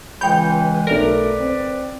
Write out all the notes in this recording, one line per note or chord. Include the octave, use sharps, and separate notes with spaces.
C#2 E3 G#3 G5 B5 G6
B1 A3 A#4 B4 D5
C4